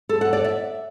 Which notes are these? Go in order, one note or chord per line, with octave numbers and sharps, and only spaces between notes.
A4
F#5
D5
E5